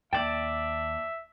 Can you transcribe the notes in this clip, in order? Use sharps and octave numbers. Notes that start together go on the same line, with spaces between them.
D#2 D5 E5 G5 A5